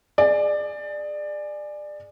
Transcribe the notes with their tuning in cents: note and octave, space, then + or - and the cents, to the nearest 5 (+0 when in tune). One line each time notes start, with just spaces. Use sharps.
G#4 +0 D5 +20